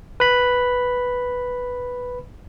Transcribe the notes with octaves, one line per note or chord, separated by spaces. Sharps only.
B4 B5